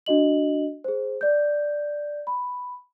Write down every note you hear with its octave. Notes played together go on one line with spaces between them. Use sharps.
D4 F#4 D#5 F#7
G#4 C5
D5 G6
B5